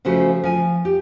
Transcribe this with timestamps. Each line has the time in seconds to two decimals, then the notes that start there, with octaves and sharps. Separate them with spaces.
0.05 C#3 F3 A3 F#4 G#4 C5
0.44 F3 G#5
0.85 G4